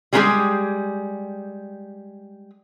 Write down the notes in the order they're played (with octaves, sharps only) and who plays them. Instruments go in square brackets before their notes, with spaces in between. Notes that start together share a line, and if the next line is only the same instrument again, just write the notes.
[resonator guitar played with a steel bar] G3 G#3 A#3 C#4 G4 G#4